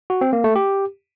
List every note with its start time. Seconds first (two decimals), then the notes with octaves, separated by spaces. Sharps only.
0.10 F#4
0.21 C4
0.33 A#3
0.44 A3
0.56 G4